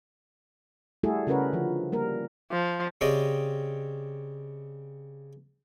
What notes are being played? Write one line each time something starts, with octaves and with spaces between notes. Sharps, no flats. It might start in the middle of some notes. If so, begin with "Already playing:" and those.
G3 A3 E4 F#4 G#4 A4
C#3 F#4 A#4 B4 C#5
D3 F3
G3 A#3 A#4
F3
C#3 C4 C#4 G4 D5 D#5